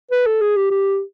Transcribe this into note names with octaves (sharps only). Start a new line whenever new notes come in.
B4
A4
G#4
G4
G4